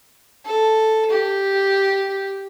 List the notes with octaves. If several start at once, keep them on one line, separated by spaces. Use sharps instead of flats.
A4
G4